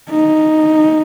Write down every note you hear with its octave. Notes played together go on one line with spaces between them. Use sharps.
D#4